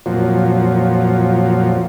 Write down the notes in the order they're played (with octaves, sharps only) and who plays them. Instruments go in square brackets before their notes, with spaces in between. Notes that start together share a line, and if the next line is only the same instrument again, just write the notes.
[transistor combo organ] F2 A#2 F3 F#3